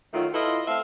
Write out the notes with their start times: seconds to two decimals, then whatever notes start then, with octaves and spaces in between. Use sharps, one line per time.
0.14 D#3 F#3 A3 F4
0.34 E4 F4 A4 B4 D#5
0.68 A3 C4 E5 F5